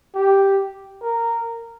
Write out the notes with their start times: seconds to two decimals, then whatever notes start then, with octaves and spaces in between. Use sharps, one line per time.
0.15 G4
1.03 A#4